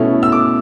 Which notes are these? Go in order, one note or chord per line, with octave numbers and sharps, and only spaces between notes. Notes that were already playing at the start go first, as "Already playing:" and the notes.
Already playing: B2 A3 C#4 E4
E6
D6